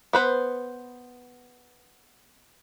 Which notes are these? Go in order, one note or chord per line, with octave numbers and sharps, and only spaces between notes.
B3 B4 C5